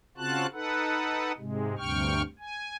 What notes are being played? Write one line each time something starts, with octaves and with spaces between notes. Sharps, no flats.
C#3 C4 F4 F#4 A5 F#6
D#4 A4 B4 F#5
G#2 C3 G#3
D2 G2 C3 G5 C#6 F6
G#5